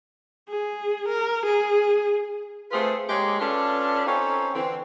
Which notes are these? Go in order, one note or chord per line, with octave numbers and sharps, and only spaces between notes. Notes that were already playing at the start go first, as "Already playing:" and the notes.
G#4
A#4
G#4
A3 C4 F4 G#4 B4
G#3 A#3 G4 G#4 C#5
C#4 D4 F4 A4 B4
C4 C#4 D#4 F4 A4
D3 E3 C4